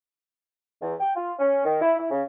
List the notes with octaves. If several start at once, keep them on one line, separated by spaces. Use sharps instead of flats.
E2
G5
F4
C#4
D#3
E4
E4
C#3